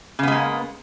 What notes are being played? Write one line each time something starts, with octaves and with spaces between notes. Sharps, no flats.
C#3 G#3 A#3 B3